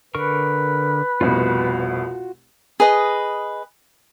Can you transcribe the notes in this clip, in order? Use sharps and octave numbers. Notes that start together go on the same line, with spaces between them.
D3 A#4 B4 C#6
F1 C2 B2 F4 F#4
G#4 B4 D#5